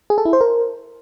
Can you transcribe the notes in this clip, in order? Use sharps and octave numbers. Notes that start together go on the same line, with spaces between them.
G#4
A4
E4
C5
A#4